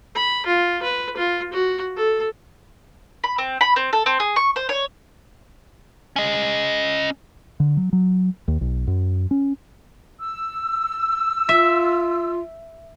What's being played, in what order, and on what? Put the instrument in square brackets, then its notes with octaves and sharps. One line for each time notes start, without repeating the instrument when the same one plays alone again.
[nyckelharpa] B5
F4
B4
F4
F#4
A4
[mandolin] B5
C4
B5
C4
A4
C4
G#4
C#6
C5
C#5
[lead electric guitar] C#4 D#5
[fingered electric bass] D3
F#3
F#3
D#2
B1
F#2
C#4
[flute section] E6
[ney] F4 [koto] E5